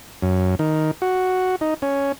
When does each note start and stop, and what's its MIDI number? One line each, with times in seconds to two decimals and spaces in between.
0.22 0.55 42
0.59 0.91 51
1.02 1.56 66
1.61 1.74 63
1.82 2.12 61